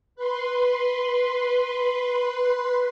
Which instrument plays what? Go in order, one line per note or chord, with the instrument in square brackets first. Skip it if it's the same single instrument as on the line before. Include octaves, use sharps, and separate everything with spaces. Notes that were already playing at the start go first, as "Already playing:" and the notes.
[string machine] B4 C6